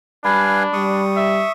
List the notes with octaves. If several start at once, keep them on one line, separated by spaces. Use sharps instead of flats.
G3 D4 B4 F5 G#5 B5
G3 C#6 D#6
E5